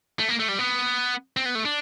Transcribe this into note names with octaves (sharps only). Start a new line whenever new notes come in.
A3
A#3
A3
G3
B3
C4
B3
A3
D4